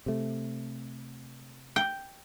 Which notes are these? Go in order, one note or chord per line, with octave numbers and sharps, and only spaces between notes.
C3 A3
G5